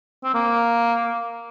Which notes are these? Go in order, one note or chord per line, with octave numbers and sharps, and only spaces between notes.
C4
A#3